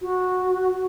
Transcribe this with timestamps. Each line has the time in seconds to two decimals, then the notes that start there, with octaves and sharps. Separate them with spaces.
0.01 F#4